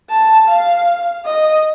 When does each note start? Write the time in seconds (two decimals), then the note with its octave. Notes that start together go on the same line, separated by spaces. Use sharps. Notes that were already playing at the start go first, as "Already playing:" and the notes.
0.10 A5
0.48 F5
1.26 D#5